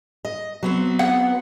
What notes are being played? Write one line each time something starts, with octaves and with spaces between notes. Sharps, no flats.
D#5
F#3 B3 C4
F#5